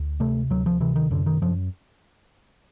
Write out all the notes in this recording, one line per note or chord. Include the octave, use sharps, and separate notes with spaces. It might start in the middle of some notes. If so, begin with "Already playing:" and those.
Already playing: D2
C3 A3
D2 F#3
F3
C3 E3
D#3
F#2 D3
D#3
F#2 F3